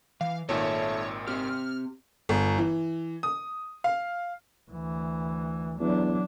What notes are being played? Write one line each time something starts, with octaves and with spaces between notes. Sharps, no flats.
E3 F5
G#1 A#2 D#3 A4 C#5 E5 A5
C4 G4 F6
G1
E3
D#6
F5
D2 E3
E2 F#3 D4